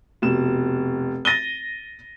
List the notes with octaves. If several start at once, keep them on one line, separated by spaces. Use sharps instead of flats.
F1 B2 E7
A6 A#6 D#7 G7